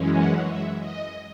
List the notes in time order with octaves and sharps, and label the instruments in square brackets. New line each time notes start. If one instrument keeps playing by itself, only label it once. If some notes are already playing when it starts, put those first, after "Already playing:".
Already playing: [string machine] F#2 E3 G#3 C#4
F#5
E5
D#5